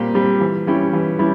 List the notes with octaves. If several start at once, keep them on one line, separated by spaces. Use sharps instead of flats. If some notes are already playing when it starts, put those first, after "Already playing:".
Already playing: A#2 G3 C4 G4
G3 C4 G4
E3
G3 C#4 E4 G4
E3
G3 C#4 E4